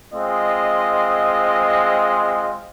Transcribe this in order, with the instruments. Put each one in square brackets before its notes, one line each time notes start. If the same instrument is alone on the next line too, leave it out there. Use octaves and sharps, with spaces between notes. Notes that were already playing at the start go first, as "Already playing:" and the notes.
[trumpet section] G#3 C4 F4 D#5